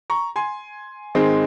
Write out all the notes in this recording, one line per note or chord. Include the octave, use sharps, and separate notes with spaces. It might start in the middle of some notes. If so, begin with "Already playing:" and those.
A#5 C#6
G#5 C6
G#2 D#3 G#3 C4 D#4